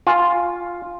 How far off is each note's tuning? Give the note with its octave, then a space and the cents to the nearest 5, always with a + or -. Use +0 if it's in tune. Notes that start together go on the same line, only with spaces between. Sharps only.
F4 +0 G#5 +0